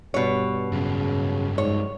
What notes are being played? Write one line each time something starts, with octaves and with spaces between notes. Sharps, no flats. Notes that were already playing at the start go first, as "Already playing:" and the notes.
G2 B2 C#5
G2 C#3 F#3
G#2 C#5